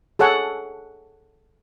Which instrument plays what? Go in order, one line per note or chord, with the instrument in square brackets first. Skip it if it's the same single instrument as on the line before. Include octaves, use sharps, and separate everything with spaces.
[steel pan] G#4 A4 C#5 F#5